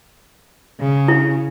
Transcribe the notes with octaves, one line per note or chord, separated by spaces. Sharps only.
C#3
E4